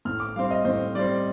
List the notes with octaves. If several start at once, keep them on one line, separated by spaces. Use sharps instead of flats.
A2 F6
D6
G3 C4 F5
D#5
A2 C5
G3 C4 D5